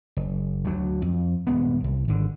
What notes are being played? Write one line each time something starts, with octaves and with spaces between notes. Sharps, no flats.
F#1
D2 F#3
F2
D#1 G2 G#3 B3
C2
G#1 D3